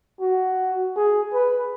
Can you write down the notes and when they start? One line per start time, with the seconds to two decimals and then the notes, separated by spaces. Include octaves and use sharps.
0.21 F#4
0.96 G#4
1.33 B4